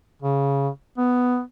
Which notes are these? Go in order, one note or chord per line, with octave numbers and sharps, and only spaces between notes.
C#3
B3